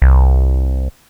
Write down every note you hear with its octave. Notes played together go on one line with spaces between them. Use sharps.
C2